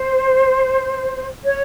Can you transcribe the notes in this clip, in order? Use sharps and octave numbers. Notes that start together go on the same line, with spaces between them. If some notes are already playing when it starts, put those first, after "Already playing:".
Already playing: C5
C#5